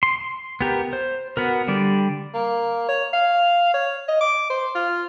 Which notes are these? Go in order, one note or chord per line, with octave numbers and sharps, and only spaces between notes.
C6
B3 G4 A#4
C5
B3 F#4 A#4
D3 G3 D5
A#3
C#5
F5
C#5
D#5
D6
C5
F4